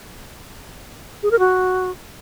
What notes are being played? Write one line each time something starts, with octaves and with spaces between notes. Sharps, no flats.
G#4
A#4
F#4